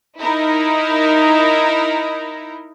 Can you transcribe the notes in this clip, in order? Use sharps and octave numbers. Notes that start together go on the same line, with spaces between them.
D#4 E4 A#4